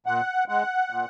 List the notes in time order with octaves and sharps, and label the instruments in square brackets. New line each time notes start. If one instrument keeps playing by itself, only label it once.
[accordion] A#2 F#5
G#3 F#5
A#2